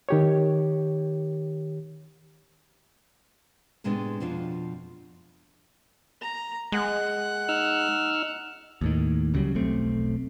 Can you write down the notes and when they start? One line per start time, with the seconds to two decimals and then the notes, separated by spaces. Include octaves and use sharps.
0.09 D#3 G4 C#5
3.84 A2 C3 G#3 B3 C4 D4
4.20 F2 B2 F3 D4 F4
6.22 A#5
6.72 G#3 F#5
7.49 D#4 E6 F6
8.81 D#2 A2 D#3
9.34 C#2 C#3 F#3 G3
9.55 E1 B1 A3 C4